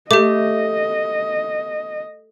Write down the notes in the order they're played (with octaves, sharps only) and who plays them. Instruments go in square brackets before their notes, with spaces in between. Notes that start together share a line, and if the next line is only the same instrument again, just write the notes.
[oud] A3 [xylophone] G4 D6 [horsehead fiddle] D#5